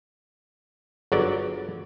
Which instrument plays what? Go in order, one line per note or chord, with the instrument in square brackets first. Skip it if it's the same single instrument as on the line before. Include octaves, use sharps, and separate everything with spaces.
[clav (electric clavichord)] G1 F#3 D5 [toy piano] F4 G#4